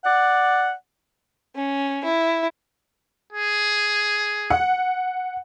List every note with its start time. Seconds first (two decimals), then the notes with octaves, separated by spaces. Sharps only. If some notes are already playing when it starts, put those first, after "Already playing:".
0.05 D5 F#5
1.56 C#4
2.04 E4
3.33 G#4
4.50 F#5